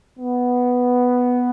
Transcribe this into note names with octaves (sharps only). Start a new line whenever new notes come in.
B3